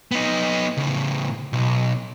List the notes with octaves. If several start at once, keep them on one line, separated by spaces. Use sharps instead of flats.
B3 D#4
A2 C#3
B1